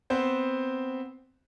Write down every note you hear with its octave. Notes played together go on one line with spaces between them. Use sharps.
B3 C4 C5